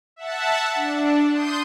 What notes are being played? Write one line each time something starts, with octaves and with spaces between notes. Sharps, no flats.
E5 F#5 A5
D4
C6 D#6 G6